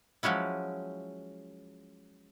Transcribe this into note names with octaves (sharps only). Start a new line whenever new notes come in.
F3 F#3 G#3 C#4 E4